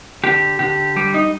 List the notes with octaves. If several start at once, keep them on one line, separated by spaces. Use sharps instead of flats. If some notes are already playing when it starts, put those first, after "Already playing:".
D3 G4
D3 G4
G3 G4
D#4